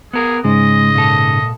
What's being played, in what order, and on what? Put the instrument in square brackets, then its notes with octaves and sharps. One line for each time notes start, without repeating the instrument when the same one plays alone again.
[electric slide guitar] B3 A#4 [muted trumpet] G#4
[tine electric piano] G#2 C#3 [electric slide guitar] G#3 [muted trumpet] D#5
[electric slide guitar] A#2 A4